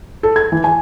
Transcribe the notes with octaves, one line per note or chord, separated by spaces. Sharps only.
A4
G#6
E3
G#5